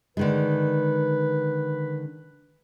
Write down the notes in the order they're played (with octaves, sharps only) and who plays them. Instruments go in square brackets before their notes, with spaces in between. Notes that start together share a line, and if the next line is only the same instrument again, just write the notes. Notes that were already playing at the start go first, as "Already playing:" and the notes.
[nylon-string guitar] D3 D#3 G#3 [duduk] B4